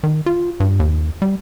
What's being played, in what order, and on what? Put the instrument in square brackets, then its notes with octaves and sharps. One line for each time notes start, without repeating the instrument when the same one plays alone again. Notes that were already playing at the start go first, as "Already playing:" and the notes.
[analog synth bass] D#3
F4
G2
D#2
G3